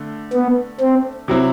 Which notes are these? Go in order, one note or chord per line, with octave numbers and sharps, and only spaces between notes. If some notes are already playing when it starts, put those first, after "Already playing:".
Already playing: D3 A3
B3
C4
C3 F#3 C4 E4